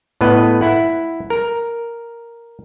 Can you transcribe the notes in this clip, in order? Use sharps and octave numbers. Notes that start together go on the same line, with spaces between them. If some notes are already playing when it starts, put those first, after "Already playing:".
A2 B3 B4 D#5
E4 F#5
A#4